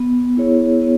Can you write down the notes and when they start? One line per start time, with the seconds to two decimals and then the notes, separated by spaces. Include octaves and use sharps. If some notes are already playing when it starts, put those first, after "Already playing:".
Already playing: B3
0.37 E4 G#4 C#5
0.82 B3